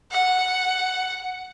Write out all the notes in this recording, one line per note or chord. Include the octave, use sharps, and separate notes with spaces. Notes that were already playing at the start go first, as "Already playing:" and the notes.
F#5